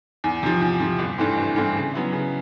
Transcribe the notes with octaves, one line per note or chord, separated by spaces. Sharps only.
E2
C3 F3
E2
C3 F3
G1
G2 E3 A3 C4
G1
G2 E3 A3 C4
C#3
F#3 B3 E4
C#3